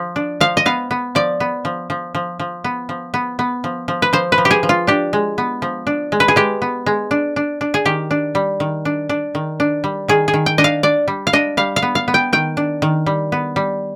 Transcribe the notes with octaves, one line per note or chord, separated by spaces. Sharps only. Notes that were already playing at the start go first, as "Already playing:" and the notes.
Already playing: F3
D4
F3 F5
D#5
B3 F5
B3
F3 D5
B3
F3
F3
F3
F3
B3
F3
B3
B3
F3
F3
B4
F3 C5
B4
F3
G4
G#4
F3
F4
D4 G4
G#3
B3
F3
D4
G#3
B4
G#4
G#3 G4
B3
G#3
D4
D4
D4
G#4
D#3 G4
D4
G3
D#3
D4
D4
D#3
D4
G3
D#3 G#4
G#4
D#3
G5
D4 D#5
F5
D4 D5
G3
F5
D4 D#5
G3 F5
F5
B3
F5
B3
G5
D#3 G5
D4
D#3
G3
B3
G3